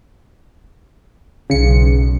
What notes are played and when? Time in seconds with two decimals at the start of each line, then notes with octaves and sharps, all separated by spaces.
1.50 B1 C#3 C#7